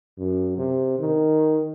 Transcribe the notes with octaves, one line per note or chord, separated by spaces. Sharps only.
F#2
C3
D#3